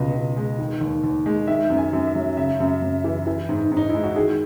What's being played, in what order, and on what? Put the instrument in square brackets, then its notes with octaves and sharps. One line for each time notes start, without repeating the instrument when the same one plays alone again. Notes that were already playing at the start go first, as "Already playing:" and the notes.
Already playing: [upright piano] C#2 B2 D#5
C#2
G#3
D#3
D#2
D#2
G#3
D#3 E5
F#2
G#5
F#2
E5
F#3
C#3 E5
F#2
F#2
E3
E3
G#2
G#2
D#4
G#3 E4
F#4
D#3 G#4